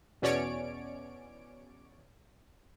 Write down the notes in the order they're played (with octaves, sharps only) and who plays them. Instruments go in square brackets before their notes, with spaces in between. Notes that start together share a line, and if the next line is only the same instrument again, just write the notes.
[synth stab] E2 B2 C#4 C#5 D5 D7